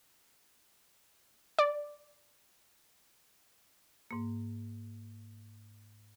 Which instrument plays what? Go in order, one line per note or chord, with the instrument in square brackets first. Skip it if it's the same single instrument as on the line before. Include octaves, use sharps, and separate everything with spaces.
[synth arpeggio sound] D5
[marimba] G#2 A#3